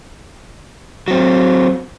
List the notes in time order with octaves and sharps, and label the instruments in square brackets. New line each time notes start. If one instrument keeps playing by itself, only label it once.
[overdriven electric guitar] F#3 C4